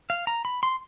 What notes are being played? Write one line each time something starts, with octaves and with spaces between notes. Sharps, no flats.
F5
A#5
B5
C6